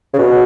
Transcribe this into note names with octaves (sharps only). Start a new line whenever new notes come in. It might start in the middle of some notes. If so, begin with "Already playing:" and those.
C#3
B2